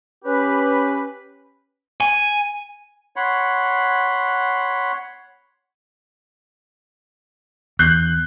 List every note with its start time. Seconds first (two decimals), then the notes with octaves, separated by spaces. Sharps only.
0.25 C#4 G4 B4
2.01 G#5
3.16 C#5 F#5 B5 C6
7.79 E2 F#6 G6 C7